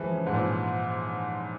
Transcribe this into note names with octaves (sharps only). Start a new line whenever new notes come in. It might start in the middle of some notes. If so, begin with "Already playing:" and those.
Already playing: E3 F3 G#3
C#3
G#2
A#2